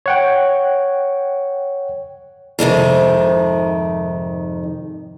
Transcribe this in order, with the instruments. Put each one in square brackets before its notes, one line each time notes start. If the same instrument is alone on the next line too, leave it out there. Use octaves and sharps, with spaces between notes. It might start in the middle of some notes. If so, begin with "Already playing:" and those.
[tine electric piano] C#5 F#5 G5
[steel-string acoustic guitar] F2 G#2 C3 D#3